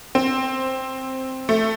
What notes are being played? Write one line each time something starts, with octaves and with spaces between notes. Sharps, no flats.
C4
A3